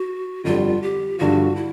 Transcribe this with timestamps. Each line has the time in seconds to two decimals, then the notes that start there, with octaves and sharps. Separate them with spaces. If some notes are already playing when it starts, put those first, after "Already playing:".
Already playing: F#4
0.44 G1 F2 D3 G3 F4
0.82 G4
1.19 G2 D3 F3 F#4
1.56 E4